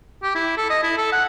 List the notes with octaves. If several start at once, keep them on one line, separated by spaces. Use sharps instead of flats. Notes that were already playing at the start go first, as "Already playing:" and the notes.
G4
E4
A4
D#5
E4
A4
F#5